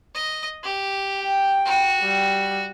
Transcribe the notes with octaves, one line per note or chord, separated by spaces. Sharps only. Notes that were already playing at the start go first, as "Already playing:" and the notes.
D#5
G4
G5
F#4
G3